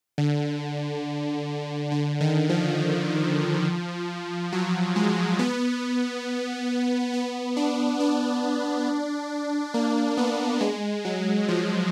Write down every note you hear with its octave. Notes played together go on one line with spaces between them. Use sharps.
D3
D3
D#3
F3
F#3
G#3
B3
B3
D4
D4
A#3
B3
G#3
F#3
F3